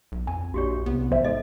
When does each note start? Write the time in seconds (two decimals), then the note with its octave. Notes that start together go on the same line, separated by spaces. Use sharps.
0.12 B1
0.27 F2 G#5
0.54 A#1 F#4 G4 C#5
0.86 C2 B3
1.11 A1 C5 E5
1.24 G#2 A4 D#5